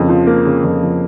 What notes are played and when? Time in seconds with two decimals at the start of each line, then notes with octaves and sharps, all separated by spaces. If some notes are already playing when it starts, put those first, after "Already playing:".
Already playing: F2 C#3 A#3
0.09 F3
0.27 A#3
0.46 C#3
0.64 F2
0.83 F3